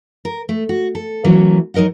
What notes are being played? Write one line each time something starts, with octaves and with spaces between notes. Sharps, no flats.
A#4
A3
F#4
A4
E3 F#3 A3 A#3 C#4 E4
F#3 D#4 A#4 D#5 F#5